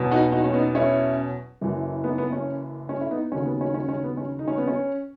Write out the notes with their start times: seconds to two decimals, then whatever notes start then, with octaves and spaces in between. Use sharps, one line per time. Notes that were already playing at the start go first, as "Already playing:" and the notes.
Already playing: E2 B2 F#3
0.11 D#4 F#4
0.32 D#4 F#4
0.44 C#4
0.53 B3 D#4
0.75 C#4 E4
1.61 F#1 F#2 E3
2.04 B3 D#4
2.18 B3
2.32 C#4
2.89 C#4
3.01 E4
3.11 B3 D#4
3.32 D#2 C#3 F#3 C#4
3.45 B3
3.61 C#4
3.74 C#4
3.89 C#4
4.04 B3
4.17 C#4
4.39 D#4
4.48 C#4
4.58 B3
4.68 C#4